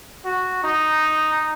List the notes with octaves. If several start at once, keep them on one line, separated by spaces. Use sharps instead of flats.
F#4
D#4